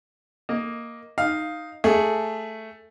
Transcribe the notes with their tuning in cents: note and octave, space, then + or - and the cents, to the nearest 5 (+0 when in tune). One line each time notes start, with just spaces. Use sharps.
A#3 +0 D#5 +0
D#4 +0 F5 +0
A3 +0 G#4 +0